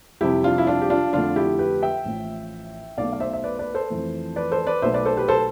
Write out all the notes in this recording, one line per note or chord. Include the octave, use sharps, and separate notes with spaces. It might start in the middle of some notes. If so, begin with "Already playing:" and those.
F2 C3 G3 E4 G4
D4 F4
E4
D4 F4
G4
D4 F4
F2 D3 A3 D4 F4
E4 G4
G4 B4
E5 G5
A1 A2 F3
B1 B2 A3 D5 F5
F5
C5 E5
E5
B4 D5
B4 D5
A4 C5
F2 E3 A3
B4 D5
A4 C5
B4 D5
B1 B2 A3 C5 E5
B4 D5
A4 C5
G4 B4
A4 C5